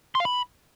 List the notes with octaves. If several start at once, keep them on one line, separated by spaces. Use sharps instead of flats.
C6
F5
B5